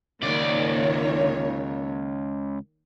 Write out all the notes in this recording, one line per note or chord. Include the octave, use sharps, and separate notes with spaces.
C#2 D#3 A#3 C#5 D5